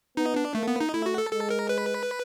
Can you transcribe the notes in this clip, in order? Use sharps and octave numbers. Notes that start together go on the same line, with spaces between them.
B3 D#4
D4
A3 A#3
B3
D#4
A3 E4
F#4
A4
G#3 A4
A#4
B4